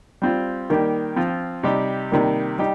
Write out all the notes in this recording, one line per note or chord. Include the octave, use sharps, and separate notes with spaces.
G3 C4 F4
D#3 G3 A#3 G4
F3 C4 F4
C3 G3 D#4 G4
C3 D#3 G3 A#3
G3 D#4 G4